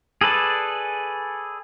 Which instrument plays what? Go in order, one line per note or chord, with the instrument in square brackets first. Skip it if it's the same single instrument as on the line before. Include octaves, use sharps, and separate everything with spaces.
[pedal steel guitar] G#4 A4 B4 D5